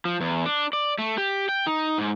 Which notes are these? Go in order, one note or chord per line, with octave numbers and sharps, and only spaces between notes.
F3
E2
D4
D5
A3
G4
G5
D#4
G#2